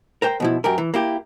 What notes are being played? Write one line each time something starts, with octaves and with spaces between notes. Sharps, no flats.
A#4 C5 G5
B2 F3 E4
F#2 G4 A#4
E3
A#3 E4 G4